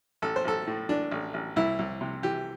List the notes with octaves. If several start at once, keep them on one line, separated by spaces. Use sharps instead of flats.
A1 A4
C5
A1 A4
A2
E3 D4
A1
A1
C2 E4
C2
C3
E3 G4